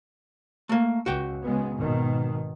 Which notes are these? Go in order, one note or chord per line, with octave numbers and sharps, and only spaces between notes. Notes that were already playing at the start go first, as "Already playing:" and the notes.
A3 A#3
C#2 F#4 G5
C#3 G#3 B3
G#1 B2 D#3